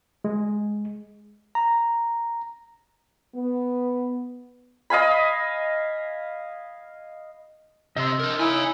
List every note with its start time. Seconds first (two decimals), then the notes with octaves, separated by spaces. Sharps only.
0.24 G#3
1.55 A#5
3.35 B3
4.90 D#5 F5 G#5 B5
7.96 C3 D#5 E5 C6
8.19 D4 A#4
8.39 D#4 E4 E5 F5 G#5